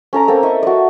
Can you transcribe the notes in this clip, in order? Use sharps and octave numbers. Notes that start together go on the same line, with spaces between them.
C#4 A4 A#5 D6
A#3 C4 A4 E6
E4 D#5 E5 C#6
F#4 D5